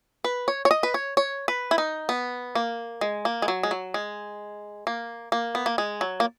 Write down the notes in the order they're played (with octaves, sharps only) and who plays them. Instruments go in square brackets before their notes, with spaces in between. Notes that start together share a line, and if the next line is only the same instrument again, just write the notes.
[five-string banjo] B4
C#5
C#5
D#5
B4
C#5
C#5
B4
E4
D#4
B3
A#3
G#3
A#3
G#3
F#3
G#3
F#3
G#3
A#3
A#3
B3
A#3
G#3
F#3
A#3